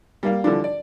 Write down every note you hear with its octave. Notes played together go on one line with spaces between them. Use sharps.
G3 A#3 F5
D3 E3 F3 G3 D4
D5